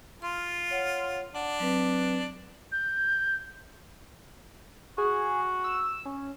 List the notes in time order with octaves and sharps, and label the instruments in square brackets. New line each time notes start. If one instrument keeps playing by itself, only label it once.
[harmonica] F4 [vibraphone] C6
[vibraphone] C#5 F#5
[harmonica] D4 [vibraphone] F#5
[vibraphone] F#3 C4 B4
[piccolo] G6
[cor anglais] F#4 [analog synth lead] G#4
[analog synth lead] E6
C#4